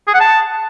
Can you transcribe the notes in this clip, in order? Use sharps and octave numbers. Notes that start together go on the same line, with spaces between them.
G#4
F#5
A5